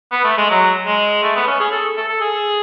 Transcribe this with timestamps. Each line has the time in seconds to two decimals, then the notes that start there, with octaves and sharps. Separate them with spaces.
0.12 B3
0.24 A3
0.38 G#3
0.50 F#3
0.86 G#3
1.23 A3
1.36 B3
1.47 C#4
1.60 G#4
1.72 A4
1.97 A4
2.08 A4
2.21 G#4